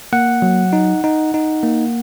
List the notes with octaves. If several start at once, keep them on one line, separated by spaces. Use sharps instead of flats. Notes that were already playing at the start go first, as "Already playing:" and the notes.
A#3 F#5
F#3
D#4
D#4
D#4
A#3